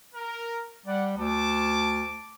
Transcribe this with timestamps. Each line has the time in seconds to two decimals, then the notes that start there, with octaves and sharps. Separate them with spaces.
0.14 A#4
0.86 G3 D5 F#5
1.18 D2 A5 D6